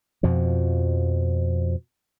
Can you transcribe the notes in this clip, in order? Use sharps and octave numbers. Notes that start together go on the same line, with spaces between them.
F2 B2 F3